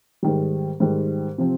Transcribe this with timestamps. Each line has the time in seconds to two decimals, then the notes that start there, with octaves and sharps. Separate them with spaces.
0.23 G#2 D#3 G3
0.80 G#2 D#3 G3
1.38 C3 F3 C4